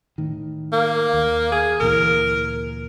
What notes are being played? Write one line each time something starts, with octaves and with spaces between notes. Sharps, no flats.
A2 D#3
A#3
D#2
G#4
D2 A#2 E3 A#4